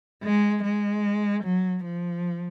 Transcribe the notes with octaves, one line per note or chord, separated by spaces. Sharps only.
G#3
G#3
F#3
F3